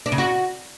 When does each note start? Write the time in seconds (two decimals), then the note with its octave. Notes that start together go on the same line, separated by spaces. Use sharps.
0.06 D4
0.12 C#3
0.18 F#4